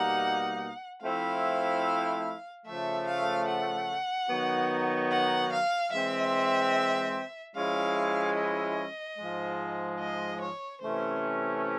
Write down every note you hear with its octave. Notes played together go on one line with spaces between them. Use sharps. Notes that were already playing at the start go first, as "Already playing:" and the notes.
Already playing: B2 G3 A#3 D#4 F#5
F3 A3 C4 E4 F5
C#3 F3 A3 E5
F5
F#5
D#3 F#3 B3 D#4 F#4
F#5
F5
E3 G#3 C4 E5
F3 G#3 C#4 E4 F5
D#5
G#2 F3 G#3
D#5
C#5
C3 E3 A3 C#4 C5